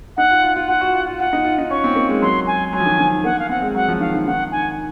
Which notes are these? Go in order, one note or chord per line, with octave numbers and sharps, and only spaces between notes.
D#4 F#5
F4
F4
F4
F4 F#5
F#4
F4
F4
F4 F#5
D#4
F4
D#4
C#4 C#6
C4
A#3
G#3
F#3 C6
G#5
F#3 G#5
F3
D#3
D#3
A#3 F#5
F5
C4 F#5
G#3
F#3 F#5
F3
D#3 F5
D#3
D#3 F#5
G#5